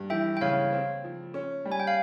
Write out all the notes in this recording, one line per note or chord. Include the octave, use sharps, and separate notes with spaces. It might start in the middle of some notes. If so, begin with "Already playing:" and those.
Already playing: G2
E3 E5 G5
G5
C#3 C#5 F5
C4
F3
C#4
G3
G#5
G5
F5